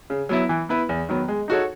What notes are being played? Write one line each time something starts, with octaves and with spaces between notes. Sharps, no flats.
C#3
F#3 B3 E4
E3
B3 E4 B4
E2
D#3 F#3 B3
G#3
D#4 F#4 A4 C#5